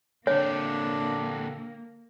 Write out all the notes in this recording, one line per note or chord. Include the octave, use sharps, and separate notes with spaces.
D3 A#3 C4 D4 C#5